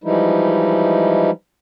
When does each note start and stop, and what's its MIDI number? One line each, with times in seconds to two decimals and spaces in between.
0.04 1.31 52
0.04 1.31 53
0.04 1.31 55
0.04 1.31 56
0.04 1.31 63
0.04 1.31 64